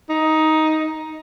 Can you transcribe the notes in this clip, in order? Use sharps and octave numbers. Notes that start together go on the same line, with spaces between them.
D#4